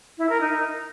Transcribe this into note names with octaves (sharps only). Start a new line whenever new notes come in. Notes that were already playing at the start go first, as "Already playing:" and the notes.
E4
A#4
D#4